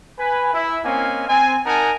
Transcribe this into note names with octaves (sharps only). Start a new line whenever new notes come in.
B4 G#5
E4
A#3 C4 C#4 D#5 F5 G#5
C4 G#5
D#4 A#4 F#5 G#5 A5